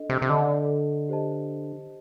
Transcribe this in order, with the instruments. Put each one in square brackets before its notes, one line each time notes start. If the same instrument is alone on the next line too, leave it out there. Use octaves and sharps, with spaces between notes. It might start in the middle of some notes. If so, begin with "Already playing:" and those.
Already playing: [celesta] D4 A4 D#5
[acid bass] C3
C3
[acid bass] D3 [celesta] D4 A4 D#5
[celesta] G4 C5 D#5 A5